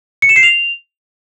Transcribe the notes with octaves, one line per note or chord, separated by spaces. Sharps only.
C#7
E7
C7
F7